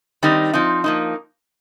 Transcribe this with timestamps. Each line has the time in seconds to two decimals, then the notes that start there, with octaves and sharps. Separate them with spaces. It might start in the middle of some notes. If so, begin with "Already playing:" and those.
0.23 D#3 G3 C4 D#4
0.53 F3 C4 D#4
0.84 F3 A#3 D#4